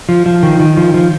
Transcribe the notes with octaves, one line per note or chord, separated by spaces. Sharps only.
F3
F3
D#3
D#3
F3
F3